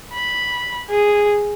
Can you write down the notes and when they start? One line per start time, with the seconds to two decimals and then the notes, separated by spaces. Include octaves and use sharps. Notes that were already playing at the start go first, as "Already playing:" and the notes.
0.14 B5
0.90 G#4